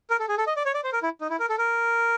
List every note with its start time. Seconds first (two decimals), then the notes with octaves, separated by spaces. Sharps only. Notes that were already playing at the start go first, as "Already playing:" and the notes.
0.10 A#4
0.19 A4
0.29 G#4
0.38 A4
0.47 D#5
0.56 D5
0.65 C#5
0.74 D5
0.84 C5
0.93 A#4
1.03 E4
1.21 D#4
1.30 E4
1.39 A#4
1.49 A4
1.58 A#4